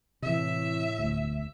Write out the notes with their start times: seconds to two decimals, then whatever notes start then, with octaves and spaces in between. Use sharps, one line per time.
0.22 A2 C3 E3 E5
0.99 E1 D2